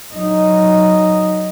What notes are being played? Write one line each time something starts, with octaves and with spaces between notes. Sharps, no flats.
F#3 D#4